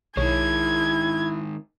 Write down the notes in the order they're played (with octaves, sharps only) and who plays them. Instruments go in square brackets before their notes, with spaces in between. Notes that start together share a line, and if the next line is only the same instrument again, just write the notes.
[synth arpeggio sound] B1 C#5 [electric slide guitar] D#3 G#3 [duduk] E4 [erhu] G#6